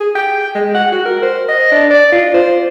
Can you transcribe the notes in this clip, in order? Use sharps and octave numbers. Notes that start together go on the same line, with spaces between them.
G#4
G5
G#3
F#5
F#4
A#4
C5
D#5
D4
D5
F4
C5